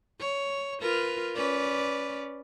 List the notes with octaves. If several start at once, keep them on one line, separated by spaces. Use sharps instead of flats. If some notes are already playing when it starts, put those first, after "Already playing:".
C#5
F4 A#4 B4
C#4 B4 D5